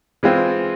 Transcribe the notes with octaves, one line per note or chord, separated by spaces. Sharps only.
E3 G#3 C4 F4